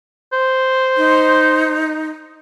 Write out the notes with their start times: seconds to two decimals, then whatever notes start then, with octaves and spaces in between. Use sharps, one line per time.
0.33 C5
0.97 D#4